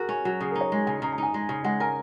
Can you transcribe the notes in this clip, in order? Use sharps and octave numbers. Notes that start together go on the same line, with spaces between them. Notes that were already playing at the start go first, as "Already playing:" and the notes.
Already playing: F#4 G#4 A#4
C#4
F#3
C#3 G#4
D#4 A#4
C#5
G#3
C#3 G#5
C#3 A#5
A#5
D#4 G#5
G#3
C#3
G#3 F#5
A#4 G#5